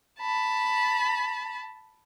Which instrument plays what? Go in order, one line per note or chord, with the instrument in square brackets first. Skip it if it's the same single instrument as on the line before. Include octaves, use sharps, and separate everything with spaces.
[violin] A5 B5